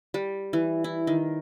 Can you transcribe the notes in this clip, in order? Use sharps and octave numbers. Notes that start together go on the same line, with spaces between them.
G3
E3
E4
D#3